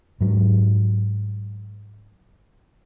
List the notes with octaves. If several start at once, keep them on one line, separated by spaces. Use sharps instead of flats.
G#2 F#3